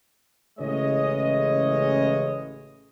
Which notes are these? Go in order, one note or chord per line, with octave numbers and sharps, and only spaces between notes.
A1 C#3 E3 G#3 C#5 D#5